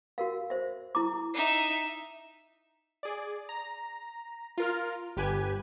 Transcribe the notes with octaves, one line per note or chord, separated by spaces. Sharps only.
F#4 A#4 F5
C5 E5
E4 A#5 D6
D#4 E5
G#4 D5
A#5
F4 A#4 F6
G1 G4 B4 G#5